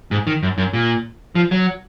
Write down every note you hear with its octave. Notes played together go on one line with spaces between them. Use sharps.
G#2
D#3
F#2
F#2
A#2
F3
F#3